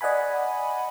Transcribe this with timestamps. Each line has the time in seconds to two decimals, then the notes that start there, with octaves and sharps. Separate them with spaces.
0.01 D5 D#5 F#5 G#5 B5